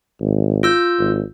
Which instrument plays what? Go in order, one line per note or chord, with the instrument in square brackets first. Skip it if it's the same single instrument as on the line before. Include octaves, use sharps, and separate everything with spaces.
[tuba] G#1
[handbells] F4 E6 G6
[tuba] G#1